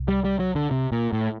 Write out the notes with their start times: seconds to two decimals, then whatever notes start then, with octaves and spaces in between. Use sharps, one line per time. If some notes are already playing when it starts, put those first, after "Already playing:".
Already playing: C2
0.08 G3
0.24 G3
0.39 F#3
0.55 D3
0.71 C3
0.92 A#2
1.13 A2